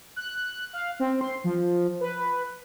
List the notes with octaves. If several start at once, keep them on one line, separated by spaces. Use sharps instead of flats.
F#6
F5
C4
C6
F3
B4